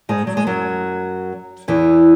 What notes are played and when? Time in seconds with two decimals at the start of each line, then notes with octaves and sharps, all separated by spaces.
0.09 G#2 G#3
0.27 F#3
0.37 G#3
0.47 F#2 F#3
1.68 E2 E3